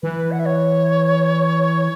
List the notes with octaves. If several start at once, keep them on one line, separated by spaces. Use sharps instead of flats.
E3 B4
F#5
E5
C#5